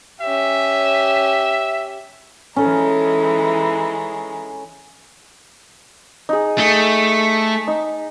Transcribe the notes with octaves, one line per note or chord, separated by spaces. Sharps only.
C#4 G4 E5
E3 G#3 C#4 D#4 A4
D#4 G#4
A3 G#4
D#4